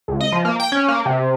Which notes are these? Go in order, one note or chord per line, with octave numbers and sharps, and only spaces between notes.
C#2
D#5
F3
A#3
G5
C#4
A#3
C3